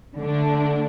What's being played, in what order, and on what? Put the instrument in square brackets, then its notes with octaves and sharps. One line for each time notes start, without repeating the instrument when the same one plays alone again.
[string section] D3 A3 D4